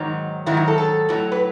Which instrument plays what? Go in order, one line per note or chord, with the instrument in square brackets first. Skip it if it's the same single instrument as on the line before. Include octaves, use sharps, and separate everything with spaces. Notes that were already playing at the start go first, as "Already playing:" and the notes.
Already playing: [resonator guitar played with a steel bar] G#2 D#3 F#3 D#4
G#2 D#3 F#3 E4
F#4
A4
A4
A2 F#3
B4